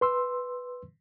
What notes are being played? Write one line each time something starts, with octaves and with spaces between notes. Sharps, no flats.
B4 C6 E6